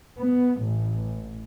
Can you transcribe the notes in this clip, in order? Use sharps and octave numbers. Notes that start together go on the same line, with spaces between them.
B3
A1